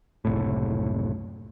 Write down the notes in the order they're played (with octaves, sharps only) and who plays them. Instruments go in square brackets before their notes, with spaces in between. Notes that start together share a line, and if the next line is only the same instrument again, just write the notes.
[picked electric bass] F#1 C2 A2